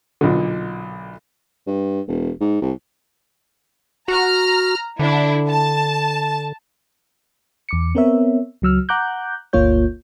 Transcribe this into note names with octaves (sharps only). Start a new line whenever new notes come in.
B1 A#2 D3
G2
E1
G#2
C2
F#4 A#5 F6
D3 D4 E4
A5
E2 D6 C#7
B3 C4 A#4 C#5 E5
C#2 F#3 E6 F6
F#5 A#5 D6 F#6 G6
G1 D2 A#3 F4 C#5 G6